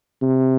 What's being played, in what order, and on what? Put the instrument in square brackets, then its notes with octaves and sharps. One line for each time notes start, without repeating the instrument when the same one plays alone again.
[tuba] C3